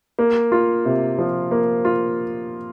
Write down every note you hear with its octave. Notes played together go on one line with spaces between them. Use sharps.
A#3
F4
C3
F3
A#3
F4